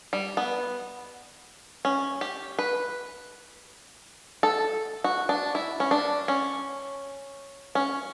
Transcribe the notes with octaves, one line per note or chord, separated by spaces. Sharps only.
G3
B3
C#4
G4
B4
A4
F#4
D4
E4
C#4
D4
C#4
C#4